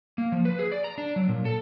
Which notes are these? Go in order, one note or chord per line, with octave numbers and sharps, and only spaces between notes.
A#3
F3
B4
G#4
D5
A#5
D4
F#3
A#2
A4